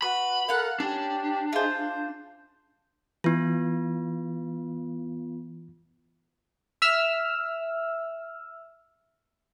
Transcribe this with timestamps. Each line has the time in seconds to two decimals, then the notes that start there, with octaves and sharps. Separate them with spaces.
0.02 F#4 B4 B5
0.48 A4 A#4 F5 F#5 F6
0.80 C#4 D4 G4
1.53 D#4 F4 G#4 C5 E5
1.70 G6
3.24 E3 B3 F4
6.82 E5 E6 F6